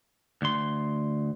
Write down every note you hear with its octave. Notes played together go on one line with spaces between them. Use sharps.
D2 C6